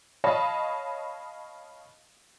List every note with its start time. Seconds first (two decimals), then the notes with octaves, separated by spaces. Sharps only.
0.24 C#5 D#5 F5 A5 B5 D#6